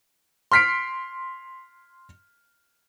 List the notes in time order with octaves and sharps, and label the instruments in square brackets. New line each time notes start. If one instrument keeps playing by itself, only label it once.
[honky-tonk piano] C6 F6 B6 C7 D7